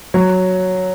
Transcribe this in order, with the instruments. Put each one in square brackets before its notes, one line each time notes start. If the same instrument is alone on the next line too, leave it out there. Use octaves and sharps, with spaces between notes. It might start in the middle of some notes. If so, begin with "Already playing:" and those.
[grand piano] F#3